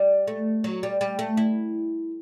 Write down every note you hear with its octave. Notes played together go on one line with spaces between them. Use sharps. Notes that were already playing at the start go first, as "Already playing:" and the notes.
Already playing: G3
A3
F#3
G3
G3
A3
E4